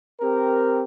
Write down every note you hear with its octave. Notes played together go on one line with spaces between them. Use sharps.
C4 G4 A#4